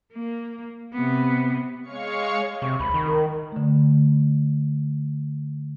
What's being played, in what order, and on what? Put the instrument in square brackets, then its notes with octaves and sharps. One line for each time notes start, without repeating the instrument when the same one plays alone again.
[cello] A#3
C3 B3
[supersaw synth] G#3 C#5 F5 C#6 C#7
[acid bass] C3 [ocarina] C#6
[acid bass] C#2 [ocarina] B5
[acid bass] D#3
[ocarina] A#4
[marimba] D3 A3